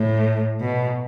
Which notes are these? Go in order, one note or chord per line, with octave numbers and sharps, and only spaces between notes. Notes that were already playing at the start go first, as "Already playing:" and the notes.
Already playing: A2
B2